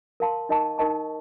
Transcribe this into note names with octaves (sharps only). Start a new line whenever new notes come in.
A#4 F5 A5 C6
D#4 A#4 D#5 A5 C#6
D#4 A#4 D#5 A5 C#6